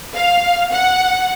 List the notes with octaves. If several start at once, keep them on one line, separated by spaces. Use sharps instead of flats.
F5
F#5